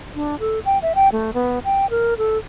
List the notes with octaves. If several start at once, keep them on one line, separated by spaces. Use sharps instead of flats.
D4
A4
G5
E5
G5
A3
B3
G5
A#4
A4